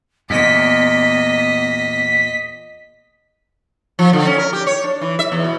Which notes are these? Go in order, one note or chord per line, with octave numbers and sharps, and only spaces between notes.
E2 A#2 B3 D#5 B6
F3
D3
C#4
A#4
G4
C#5
D4
E3
E5
E2
B2